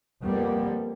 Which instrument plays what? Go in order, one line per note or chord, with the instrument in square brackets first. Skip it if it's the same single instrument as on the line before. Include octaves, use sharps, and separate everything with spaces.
[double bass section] F2 G3 A#3 B3